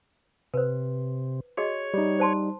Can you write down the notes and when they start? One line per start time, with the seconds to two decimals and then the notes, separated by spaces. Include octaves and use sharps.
0.54 C3 B4 C5
1.57 F#4 G#4 C#5 D#5
1.94 G3 D#4
2.20 C5 A5 C6